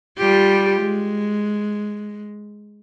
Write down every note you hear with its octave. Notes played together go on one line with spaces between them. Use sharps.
G3 F4 G4
G#3